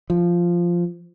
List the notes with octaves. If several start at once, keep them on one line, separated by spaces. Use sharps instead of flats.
F3